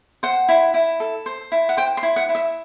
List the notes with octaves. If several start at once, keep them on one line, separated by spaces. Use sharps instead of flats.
C5 F#5
E4
E4
A4
C5
E4
F#5
C5 G5
C6
E4
F#5
E4
E5